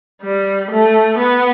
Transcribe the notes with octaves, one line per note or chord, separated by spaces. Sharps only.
G3
A3
B3